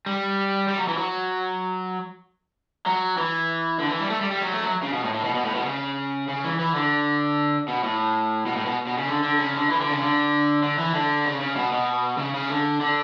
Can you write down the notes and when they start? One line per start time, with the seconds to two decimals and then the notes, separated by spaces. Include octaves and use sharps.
0.06 G3
0.68 G3
0.78 F#3
0.88 E3
0.98 F#3
2.86 F#3
3.17 E3
3.79 D3
3.89 E3
4.00 G3
4.10 A3
4.21 G3
4.31 G3
4.42 F#3
4.52 A3
4.62 F#3
4.83 C#3
4.93 B2
5.04 A2
5.14 A2
5.25 B2
5.35 B2
5.45 A2
5.55 B2
5.66 C#3
6.28 C#3
6.44 E3
6.59 E3
6.75 D3
7.68 B2
7.83 A2
8.46 B2
8.56 A2
8.66 B2
8.87 B2
8.98 C#3
9.08 D3
9.23 D3
9.39 C#3
9.54 D3
9.70 E3
9.80 D3
9.90 C#3
10.01 D3
10.63 D3
10.78 E3
10.94 D3
11.26 C#3
11.41 C#3
11.56 B2
11.72 B2
12.18 C#3
12.34 C#3
12.50 D3
12.81 D3